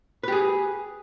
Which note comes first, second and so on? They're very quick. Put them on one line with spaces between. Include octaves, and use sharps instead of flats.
B4 G4 G#4